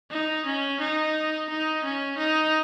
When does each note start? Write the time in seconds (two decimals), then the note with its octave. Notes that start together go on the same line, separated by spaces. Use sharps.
0.11 D#4
0.46 C#4
0.80 D#4
1.49 D#4
1.84 C#4
2.18 D#4